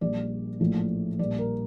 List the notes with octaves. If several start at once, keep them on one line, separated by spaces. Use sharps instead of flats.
A#1 A#2 G3 D5
A#1 A2 F3 A3
A#1 A#2 G3 D5
A#4